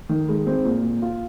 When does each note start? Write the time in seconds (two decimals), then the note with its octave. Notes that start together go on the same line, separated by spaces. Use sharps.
0.09 D#3
0.29 G#3
0.47 C4
0.65 A#2
0.83 A#2
1.02 F4